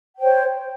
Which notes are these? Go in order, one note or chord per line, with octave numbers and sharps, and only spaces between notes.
C5 C#5 G5